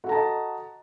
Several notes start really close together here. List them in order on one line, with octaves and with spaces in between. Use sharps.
F#4 A4 A#5 A5 D#5